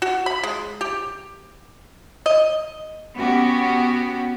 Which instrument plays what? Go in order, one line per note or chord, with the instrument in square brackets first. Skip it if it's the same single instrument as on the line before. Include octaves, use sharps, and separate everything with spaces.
[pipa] F#4
B5
G#3
G4
D#5
[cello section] B3 C#4 F#4 G4